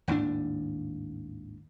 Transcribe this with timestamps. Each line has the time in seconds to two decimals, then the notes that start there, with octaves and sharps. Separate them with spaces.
0.08 G#1 D#2 A2 D4